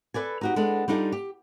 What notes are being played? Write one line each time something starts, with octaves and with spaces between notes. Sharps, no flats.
A4 B4 D5 G#5
D#4 F#4 G4
G#3 B3 D4 A4
G3 D4 D#4 F4 A4
G4